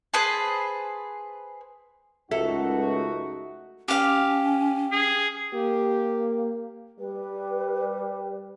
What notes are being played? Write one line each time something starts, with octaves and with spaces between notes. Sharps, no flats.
G#4 B4 C5 A5
C#2 F#2 A3 D#4 F#4 A4 E5
C#4 G4 F5
G#4
A#3 G4
G3 B4